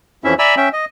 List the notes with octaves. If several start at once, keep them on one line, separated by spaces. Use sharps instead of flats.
F2 E3 F3 C#4 E4 E5
D5 E5 G#5 A#5 B5 E6
C#4 E5 G5
D#5